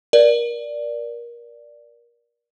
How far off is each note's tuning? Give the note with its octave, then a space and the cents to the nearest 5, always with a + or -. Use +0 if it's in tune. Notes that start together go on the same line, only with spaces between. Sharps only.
A#4 +25 D5 +0